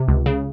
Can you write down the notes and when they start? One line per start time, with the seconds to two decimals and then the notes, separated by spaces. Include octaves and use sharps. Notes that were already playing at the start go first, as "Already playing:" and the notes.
Already playing: C3
0.08 C#2
0.26 C#3